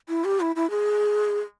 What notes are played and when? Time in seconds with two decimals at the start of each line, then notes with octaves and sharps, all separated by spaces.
0.09 E4
0.24 G4
0.40 E4
0.56 E4
0.70 G#4